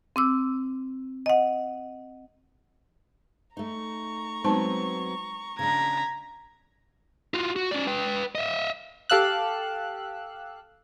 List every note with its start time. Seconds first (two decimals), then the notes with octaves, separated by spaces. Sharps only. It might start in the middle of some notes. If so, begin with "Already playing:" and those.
0.16 C4 D6 E6
1.26 D#5 F#5
3.57 A3 D#4 A#5 C#6
4.44 F#3 G#3 B3 C4 D#4 A5
5.59 C#3 D4 A#5 G#6 B6
7.34 F4 F#4
7.56 F#4
7.71 C#4 D5
7.87 B4 G5
8.35 D#5 E5
9.10 G4 A4 F5 E6 F#6